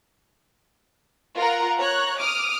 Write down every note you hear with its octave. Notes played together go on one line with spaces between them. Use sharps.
F4 A#4 F#5 A#5
C#5 A#5 F#6
D6 D#6 F6 D7